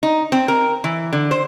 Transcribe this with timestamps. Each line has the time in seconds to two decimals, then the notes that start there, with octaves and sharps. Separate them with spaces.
0.03 D#4
0.32 C4
0.48 A#4
0.84 E3
1.13 D3
1.31 C5